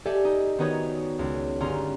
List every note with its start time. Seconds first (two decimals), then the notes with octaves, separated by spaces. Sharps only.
0.06 G4 A4 D5 E5 G#5
0.24 D#4
0.58 D#3 B3 D#4 F#4 B4 C#5
1.19 C#2
1.60 G1 C#4 A#5 C6